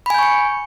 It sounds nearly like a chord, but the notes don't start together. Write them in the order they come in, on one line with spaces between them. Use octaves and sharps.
B5 G#5 G6 C#6 C#7